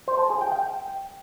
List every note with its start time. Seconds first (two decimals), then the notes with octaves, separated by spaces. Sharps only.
0.08 C5
0.19 A5
0.30 G#4
0.41 G5
0.52 G5